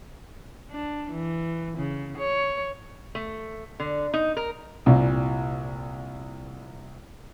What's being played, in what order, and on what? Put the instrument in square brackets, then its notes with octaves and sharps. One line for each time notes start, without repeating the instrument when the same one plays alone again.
[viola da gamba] D4
E3
C#3
C#5
[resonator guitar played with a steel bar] A3
D3
D#4
A#4
[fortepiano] C2 A#2